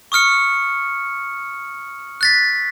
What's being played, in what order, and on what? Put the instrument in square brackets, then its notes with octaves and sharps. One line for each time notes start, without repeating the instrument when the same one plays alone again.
[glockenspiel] C#6 D#6 F6 C#7
F#6 A6 B6